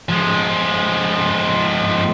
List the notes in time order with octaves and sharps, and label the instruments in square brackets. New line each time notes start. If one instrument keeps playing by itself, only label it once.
[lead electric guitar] F3 G#3